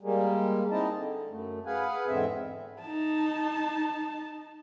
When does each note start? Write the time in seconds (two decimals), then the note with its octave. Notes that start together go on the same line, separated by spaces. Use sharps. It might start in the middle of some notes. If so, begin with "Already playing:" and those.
0.01 G3 G#3 A#3
0.71 C4 D#4 E4 D#5 A5
0.96 D3
1.30 F#2 A3
1.66 G#4 B4 F5 F#5 G#5
2.07 E2 G#2 D3 C4 E5
2.82 D#4 A5